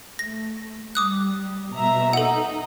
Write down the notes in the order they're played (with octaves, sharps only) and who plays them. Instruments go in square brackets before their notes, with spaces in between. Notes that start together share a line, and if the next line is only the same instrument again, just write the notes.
[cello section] A3 [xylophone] A#6
[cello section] G3 [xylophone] D6 D#6 F#6
[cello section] B2 [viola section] E5 A#5
[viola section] D#4 [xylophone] A4 F#5